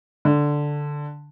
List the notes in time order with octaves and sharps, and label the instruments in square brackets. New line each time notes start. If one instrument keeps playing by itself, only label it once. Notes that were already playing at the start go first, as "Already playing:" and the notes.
[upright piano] D3